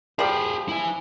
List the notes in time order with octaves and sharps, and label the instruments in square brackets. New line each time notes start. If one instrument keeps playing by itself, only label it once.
[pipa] F3 G3 [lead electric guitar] G4 G#4
[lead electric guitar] E4 G#5